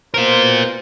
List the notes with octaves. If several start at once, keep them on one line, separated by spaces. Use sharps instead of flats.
B2 F4 A#4 C5